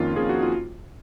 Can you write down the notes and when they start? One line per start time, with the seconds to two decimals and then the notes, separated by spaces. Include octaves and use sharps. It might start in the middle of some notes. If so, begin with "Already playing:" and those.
Already playing: F2 D#3 A#3 C#4 F4
0.16 F2 D#3 A#3 C#4 G#4
0.29 F#4
0.43 F4